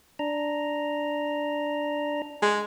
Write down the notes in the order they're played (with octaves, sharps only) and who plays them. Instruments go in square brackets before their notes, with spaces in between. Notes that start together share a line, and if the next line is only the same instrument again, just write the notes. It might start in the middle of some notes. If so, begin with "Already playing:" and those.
[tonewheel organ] D4 A#5
[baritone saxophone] G#3